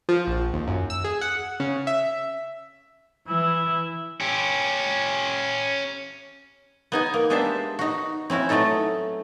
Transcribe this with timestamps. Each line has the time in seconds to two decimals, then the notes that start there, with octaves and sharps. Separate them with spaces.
0.09 F3
0.27 A#1
0.54 D#2
0.67 F#2
0.90 E6
1.04 G#4
1.21 F#5
1.60 C#3
1.87 E5
3.28 E3 E4
4.21 C#4 G4
6.92 B3 D#4 G#5
7.14 A#3
7.30 G#3 B3 D4 G4 C5 E5
7.79 D#4 F#4
8.30 C4 C#4 E4 F#4
8.49 F#3 A3 B3 D#4 A4